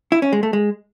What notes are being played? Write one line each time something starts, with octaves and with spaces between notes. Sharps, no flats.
E4
C#4
G#3
A3
G#3